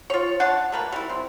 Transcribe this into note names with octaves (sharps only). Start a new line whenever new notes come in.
F4 C#5
D4 F#5 A5
A3 A#3 B4
G3 E4
C4